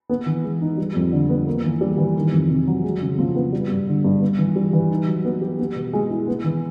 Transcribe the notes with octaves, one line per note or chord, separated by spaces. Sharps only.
B3
E3
G#3
D#4
G3
F2
D3
B3
A#3
E3
G3
E3
D#3
F2
C3
F#3
G#3
C#3
F3
B3
G3
G2
D3
G2
B3
E3
G3
E3
D#4
F#3
B3
G4
B3
B2
G#3
E4
B3
E3